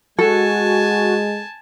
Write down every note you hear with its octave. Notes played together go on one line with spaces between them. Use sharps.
G#3 F#4 A4 G#5 A5